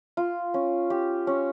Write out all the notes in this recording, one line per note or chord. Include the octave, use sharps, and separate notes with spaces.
F4
C#4
G4
C#4